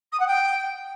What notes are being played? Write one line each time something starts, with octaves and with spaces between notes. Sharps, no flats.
D#6
F#5
G5